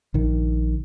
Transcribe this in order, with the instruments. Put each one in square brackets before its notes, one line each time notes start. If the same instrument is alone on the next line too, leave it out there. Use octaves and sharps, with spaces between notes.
[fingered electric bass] A#1 D#3